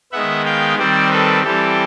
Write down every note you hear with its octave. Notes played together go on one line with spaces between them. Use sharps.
D#3 G#3 B3 E5 F#5
F5 G5
D#3 G3 C4 C5 D5
A4 B4
E3 G3 C4 G4 A4